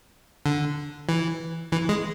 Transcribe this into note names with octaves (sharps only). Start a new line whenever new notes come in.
D3
E3
E3
G#3